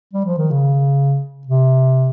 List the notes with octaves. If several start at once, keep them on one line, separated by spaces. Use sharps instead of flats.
G3
F3
D#3
C#3
C3